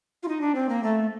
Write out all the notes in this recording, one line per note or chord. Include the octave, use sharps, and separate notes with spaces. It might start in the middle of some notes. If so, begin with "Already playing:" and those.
F4
D#4
D4
C4
A#3
A3